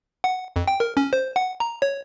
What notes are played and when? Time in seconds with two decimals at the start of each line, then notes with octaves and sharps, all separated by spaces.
0.24 F#5
0.56 F2
0.68 G5
0.80 A#4
0.97 C#4
1.13 C5
1.36 F#5
1.60 A#5
1.82 C#5